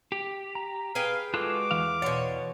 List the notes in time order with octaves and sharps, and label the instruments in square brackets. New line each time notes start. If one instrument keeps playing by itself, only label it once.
[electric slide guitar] G4
[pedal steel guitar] A#5
[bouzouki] G#4 B4 G5 [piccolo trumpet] F5
[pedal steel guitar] G#3 F#4 F#6 [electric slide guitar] F4 A4 [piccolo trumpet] D6
[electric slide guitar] E2 E3 F5
[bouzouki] B2 C#5 [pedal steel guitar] D5 F#5 C6